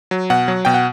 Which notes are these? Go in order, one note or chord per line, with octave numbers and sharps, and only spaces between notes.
F#3
B2 F#5
F#3
B2 G5
F#5